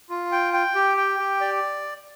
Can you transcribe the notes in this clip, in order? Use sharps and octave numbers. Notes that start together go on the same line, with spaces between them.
F4
G5
G5
G4
G5
G4
D5